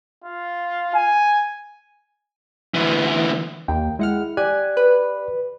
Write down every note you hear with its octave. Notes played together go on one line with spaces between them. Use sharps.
F4
G#5
D2 E3
D#2 G5
G#3 E4 F#5 F6
G4 D5 G#5 F#6
B4